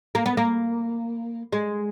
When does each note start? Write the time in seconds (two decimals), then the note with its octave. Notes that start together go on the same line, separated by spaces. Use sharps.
0.15 A#3
0.26 B3
0.37 A#3
1.53 G#3